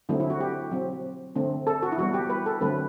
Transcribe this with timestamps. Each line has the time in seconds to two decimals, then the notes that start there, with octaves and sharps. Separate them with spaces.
0.09 D3 F#3 A3 C4 E4
0.20 E4
0.30 F#4
0.41 G4
0.71 F#3 C4
1.35 D3 A3 C4
1.67 A4
1.83 F#4
1.92 E4
1.98 E3 G3 B3 F#4
2.14 G4
2.30 B4
2.46 A4
2.61 D3 F#3 A3 C4 B4